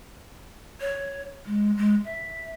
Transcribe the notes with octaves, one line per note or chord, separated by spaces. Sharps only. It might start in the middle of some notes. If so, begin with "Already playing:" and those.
C#5
G#3
G#3
E5